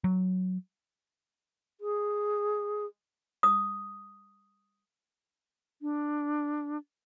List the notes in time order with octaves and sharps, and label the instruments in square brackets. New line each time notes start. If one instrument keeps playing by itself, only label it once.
[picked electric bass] F#3
[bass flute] G#4
[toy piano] D#6
[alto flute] D4